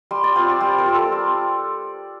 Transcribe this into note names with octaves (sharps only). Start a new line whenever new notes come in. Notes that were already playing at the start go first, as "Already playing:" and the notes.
G3 C6
D5
C4 F4 C5
G4
G3 C5
A#4
C4 F4
A4
G3